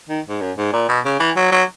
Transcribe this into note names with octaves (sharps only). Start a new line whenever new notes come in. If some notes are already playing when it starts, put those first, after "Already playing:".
D#3
G#2
F#2
G#2
A#2
B2
C#3
E3
F#3
F#3